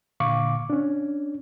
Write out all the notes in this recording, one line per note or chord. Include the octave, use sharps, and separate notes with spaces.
A#2 D3 F5 C#6 D6
C#4 D4